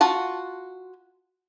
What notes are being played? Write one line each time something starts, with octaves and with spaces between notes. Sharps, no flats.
F4 F#4 A5